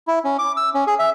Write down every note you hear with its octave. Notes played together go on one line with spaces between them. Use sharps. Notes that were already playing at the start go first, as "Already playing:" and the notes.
E4
C#4
D6
E6
C#4
G#4
E5